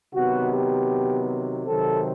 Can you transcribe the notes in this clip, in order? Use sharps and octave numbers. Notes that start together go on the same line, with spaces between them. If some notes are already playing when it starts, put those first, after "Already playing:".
C3 D#3 F#3 B3 F#4
G4
C3 D#3 F#3 C4 A4